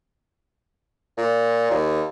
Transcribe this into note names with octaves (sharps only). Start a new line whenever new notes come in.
A#2
D#2